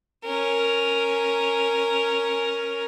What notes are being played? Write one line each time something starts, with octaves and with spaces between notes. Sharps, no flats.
C#4 A#4